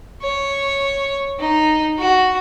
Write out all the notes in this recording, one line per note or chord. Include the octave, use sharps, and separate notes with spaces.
C#5
D#4
F#4